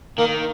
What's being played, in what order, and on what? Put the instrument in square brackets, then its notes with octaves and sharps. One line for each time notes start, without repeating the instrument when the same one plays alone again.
[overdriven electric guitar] D#3 [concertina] A#3 A#4